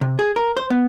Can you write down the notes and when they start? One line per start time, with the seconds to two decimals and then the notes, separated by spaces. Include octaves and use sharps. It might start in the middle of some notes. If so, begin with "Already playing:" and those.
0.01 C3
0.19 G#4
0.36 A#4
0.57 C5
0.70 B3